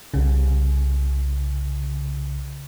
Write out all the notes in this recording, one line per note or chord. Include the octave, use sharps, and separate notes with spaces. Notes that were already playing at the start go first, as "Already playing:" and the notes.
C2 C#3